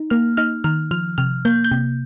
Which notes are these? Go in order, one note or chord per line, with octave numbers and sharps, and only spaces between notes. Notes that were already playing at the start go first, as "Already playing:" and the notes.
Already playing: D#4
A#3 F6
D#4 F6
D#3 F6
F3 F6
C3 F6
A#3 G6
G6
C3